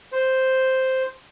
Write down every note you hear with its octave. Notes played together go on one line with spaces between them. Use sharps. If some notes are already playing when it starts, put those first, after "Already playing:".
C5